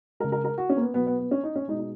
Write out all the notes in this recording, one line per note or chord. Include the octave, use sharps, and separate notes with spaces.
C#3 G#3 A#4
A#4
A#4
F#4
C#4
A#3
B3
B2 F#3 B3
B3
B3
C#4
D#4
C#4
B2 G#3 D#4
D#4